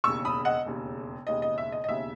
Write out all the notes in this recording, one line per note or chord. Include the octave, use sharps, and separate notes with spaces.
E1 D#2 C#3 C#6 E6
B5 D#6
D#5 F#5
E1 D#2 C#3
E1 D#2 C#3 D#5
D#5
E5
D#5
D#5
E1 D#2 C#3 E5